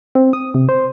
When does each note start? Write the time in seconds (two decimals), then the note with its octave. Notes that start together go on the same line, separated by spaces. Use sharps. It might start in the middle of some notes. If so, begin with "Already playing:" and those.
0.15 C4
0.33 D#6
0.54 C3
0.69 C5